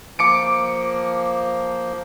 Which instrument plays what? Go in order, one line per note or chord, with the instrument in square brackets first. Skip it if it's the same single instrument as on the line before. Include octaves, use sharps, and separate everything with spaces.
[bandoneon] F3 A#3 [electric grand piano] D6 C#7 D7